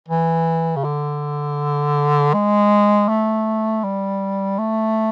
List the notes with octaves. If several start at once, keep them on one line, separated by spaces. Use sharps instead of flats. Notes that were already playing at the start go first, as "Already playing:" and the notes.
E3
C#3
D3
G#3
A3
G3
A3